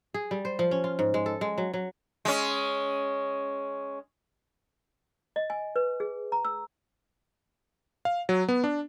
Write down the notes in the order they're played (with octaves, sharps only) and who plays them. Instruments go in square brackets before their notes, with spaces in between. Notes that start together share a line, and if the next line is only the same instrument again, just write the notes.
[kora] G#4
G3
C5
F3
C#4
F4
G#2
G#3
A4
G#3
F#3
F#3
[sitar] G#3 C#4
[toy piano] D#5
G#5
B4
G#4
A#5
E6
[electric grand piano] F5
F#3
B3
D4